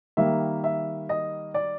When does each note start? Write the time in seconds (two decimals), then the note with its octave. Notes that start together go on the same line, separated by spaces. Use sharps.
0.17 D#3 G3 A#3 E5
0.64 E5
1.09 D#5
1.54 D5